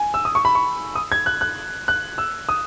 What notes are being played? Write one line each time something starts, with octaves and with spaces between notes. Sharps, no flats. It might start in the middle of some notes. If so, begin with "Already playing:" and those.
Already playing: G#5
E6
D#6
C#6
B5
C#6
D#6
G#6
F#6
F#6
F#6
E6
D#6